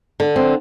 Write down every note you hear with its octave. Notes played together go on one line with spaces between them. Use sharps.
D3
C4